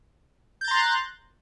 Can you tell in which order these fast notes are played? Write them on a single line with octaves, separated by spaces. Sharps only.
G6 A6 A#5 C6 F#6